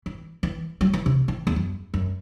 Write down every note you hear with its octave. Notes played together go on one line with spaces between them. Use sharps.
E3
E3
F#3
E3
C3
E3
E2
F#2
F#2